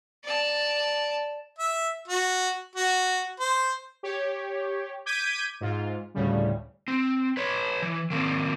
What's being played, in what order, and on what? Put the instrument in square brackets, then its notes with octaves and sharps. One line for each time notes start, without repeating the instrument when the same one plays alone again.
[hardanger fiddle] D5 A5
[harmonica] E5
F#4
F#4
C5
[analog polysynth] G4 C#5
D6 G6 G#6 B6 D7 D#7
G#2 F4
D2 A2 C#3 G3
[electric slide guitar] C4
B4 C#5
E3
D#3 A#3 C4